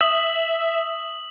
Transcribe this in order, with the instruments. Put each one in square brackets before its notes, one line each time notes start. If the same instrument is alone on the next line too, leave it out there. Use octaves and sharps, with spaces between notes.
[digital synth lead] E5 [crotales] D#6 F#7